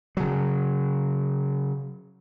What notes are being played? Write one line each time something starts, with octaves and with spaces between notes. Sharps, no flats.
C#3 F#3